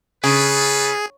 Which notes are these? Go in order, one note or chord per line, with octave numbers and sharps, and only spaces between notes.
C#3 F4 G#4 A4 B4